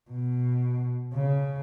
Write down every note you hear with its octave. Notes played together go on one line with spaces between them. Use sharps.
B2
C#3